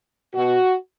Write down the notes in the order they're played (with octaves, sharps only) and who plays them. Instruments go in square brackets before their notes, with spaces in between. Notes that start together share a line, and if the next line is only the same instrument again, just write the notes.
[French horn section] B2 F#4